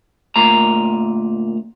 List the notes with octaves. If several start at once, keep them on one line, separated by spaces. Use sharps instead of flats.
D2 A#2 A#5